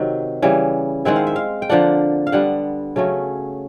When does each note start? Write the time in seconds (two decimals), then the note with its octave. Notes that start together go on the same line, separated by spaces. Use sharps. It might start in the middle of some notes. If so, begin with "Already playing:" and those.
Already playing: C3 D#3 F#3 E5
0.42 C#3 E3 G3
1.05 D#3 G#3 C4 E4 F#5
1.16 F5
1.27 E5
1.36 F5
1.62 G5
1.69 D3 F3 A#3 D4 F#5
2.27 F5
2.32 D3 G3 B3 F#5
2.96 C#3 F#3 A3 C#4